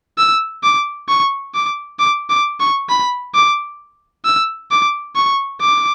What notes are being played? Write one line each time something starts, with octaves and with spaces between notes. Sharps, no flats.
E6
D6
C#6
D6
D6
D6
C#6
B5
D6
E6
D6
C#6
D6